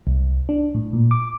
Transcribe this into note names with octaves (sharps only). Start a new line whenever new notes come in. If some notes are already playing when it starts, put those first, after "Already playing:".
C2
D4
A2
A#2
D6